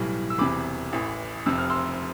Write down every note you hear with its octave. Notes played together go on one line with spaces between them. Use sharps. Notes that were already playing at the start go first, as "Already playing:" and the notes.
Already playing: B1 A2 E3 G3
E6
E1 E2 C3 B5 D6
A1 A2 E3
F1 F2 C3 E6
F6
C6 E6